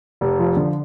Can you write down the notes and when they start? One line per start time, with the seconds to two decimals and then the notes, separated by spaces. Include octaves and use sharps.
0.21 F1
0.39 F3
0.57 D3